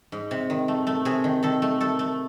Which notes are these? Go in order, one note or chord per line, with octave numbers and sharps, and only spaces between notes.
G#2
C3
D#3
A3
A3
C3 G#4
D#3
D#3 A4
A3
A3 A4
A3